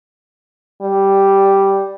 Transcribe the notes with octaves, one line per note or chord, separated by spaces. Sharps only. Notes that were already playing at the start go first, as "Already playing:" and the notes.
G3